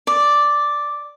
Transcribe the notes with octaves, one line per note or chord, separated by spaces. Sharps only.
D5